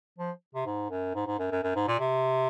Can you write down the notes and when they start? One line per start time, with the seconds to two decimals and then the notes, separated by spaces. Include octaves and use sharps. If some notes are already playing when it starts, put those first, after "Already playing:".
0.18 F3
0.54 C3
0.66 G#2
0.90 F#2
1.15 G#2
1.26 G#2
1.39 F#2
1.51 F#2
1.63 F#2
1.76 G#2
1.87 A#2
1.99 C3